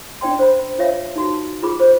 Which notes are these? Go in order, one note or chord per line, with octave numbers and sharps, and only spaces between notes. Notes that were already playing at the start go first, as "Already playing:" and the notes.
C#4 D4 D5 G5 C6
C5 B5
F4 C#5 E5 F5
D#4 F#4
F4 G#4 B5 D6
C5